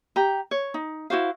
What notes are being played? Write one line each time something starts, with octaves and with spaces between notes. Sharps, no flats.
G4 A#5
C#5
D#4
E4 F#4 C5 F5